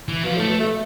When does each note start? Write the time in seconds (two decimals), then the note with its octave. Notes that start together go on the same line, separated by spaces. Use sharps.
0.08 E3
0.24 B2 F3
0.36 A2 A3
0.48 B2
0.59 A3